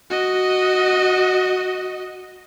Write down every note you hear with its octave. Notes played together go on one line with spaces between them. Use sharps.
F#4 D#5